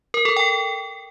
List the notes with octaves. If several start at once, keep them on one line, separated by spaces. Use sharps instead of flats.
A#4
A4
G5